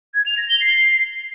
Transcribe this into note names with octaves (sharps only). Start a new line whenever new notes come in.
G#6
F7
A#6
G7
C7